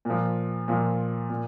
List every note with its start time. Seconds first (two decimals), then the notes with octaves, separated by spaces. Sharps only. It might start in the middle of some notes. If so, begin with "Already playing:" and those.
0.05 A#2 F3
0.68 A#2 F3
1.30 A#2